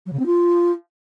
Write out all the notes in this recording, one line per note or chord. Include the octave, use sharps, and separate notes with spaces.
F#3
C#3
C4
F4